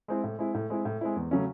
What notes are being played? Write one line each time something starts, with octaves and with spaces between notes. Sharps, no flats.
G#3 C4 E4
A2
G#3 C4 E4
A2
G#3 C4 E4
A2
G#3 C4 E4
E2
C#3 F#3 A3 C#4